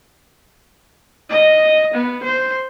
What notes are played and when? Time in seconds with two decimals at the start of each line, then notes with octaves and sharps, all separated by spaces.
1.30 D#5
1.94 B3
2.24 C5